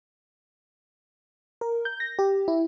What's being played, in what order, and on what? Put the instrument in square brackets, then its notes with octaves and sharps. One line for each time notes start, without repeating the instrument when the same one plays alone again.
[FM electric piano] A#4
G6
A#6
G4
E4